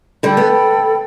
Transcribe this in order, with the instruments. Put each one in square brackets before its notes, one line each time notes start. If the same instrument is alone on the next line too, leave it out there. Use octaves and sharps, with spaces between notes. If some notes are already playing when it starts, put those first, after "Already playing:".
[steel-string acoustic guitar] D3 G3 [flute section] A4 G5 B5
[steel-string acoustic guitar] B3